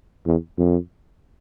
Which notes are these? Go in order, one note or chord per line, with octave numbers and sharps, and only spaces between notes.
E2
F2